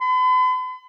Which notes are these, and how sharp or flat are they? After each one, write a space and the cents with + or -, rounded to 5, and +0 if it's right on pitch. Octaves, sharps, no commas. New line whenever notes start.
B5 +45